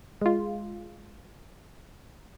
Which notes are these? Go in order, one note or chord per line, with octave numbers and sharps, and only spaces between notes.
G#3 F4